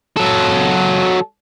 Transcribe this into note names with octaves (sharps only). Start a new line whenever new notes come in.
F#3 A4